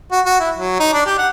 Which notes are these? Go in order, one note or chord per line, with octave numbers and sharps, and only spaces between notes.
F#4
F#4
E4
F#3
D#4
D4
G4
F#5